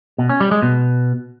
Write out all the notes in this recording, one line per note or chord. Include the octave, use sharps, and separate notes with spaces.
B2
C#4
G3
G#3
B2